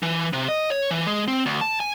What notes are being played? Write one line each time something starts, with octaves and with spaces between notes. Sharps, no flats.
E3
C3
D#5
C#5
E3
G#3
C4
D2
A5
G#5